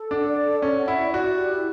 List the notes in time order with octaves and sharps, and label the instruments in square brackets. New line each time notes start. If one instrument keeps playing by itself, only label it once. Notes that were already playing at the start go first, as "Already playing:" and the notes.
Already playing: [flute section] A4
[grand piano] D4 [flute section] F#5
[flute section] D5
A4
[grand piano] C#4 [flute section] A4
[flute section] F#5
[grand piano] E4
[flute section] D5
[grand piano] F#4 [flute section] D5
[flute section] G4
E4